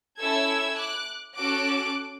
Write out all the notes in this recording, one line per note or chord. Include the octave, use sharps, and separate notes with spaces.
C#4 E4 A4 E6 G#6
D6 F#6
C#4 F#4 A4 D6 F#6